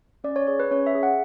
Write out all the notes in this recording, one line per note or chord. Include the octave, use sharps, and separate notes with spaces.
C#4 D5
C#5
G#4 C#5
B4
C#4 C#5
E5
G#4
F#5